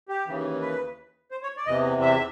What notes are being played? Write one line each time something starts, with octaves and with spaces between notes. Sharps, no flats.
G4
D#2 C#3 E3
B4
C5
C#5
D5
E2 C3 E3 D#5
E5